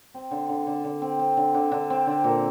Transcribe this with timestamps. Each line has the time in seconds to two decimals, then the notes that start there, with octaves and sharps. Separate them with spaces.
0.14 C4
0.31 D3
0.49 D3
0.67 D3
0.84 D3
1.02 C4
1.19 C4
1.37 D3
1.54 D3
1.72 D3
1.90 C4
2.07 D3
2.24 A#2